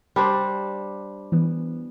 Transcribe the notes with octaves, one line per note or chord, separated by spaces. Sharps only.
G3 D4 C5
E3 B3